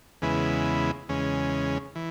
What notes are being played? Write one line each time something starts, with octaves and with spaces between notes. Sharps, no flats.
E2 C#3 G#3 B3 E4
E2 C#3 G#3 C#4
E3